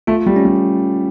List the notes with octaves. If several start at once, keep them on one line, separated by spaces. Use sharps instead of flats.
A3 F4
G3
C#4
G3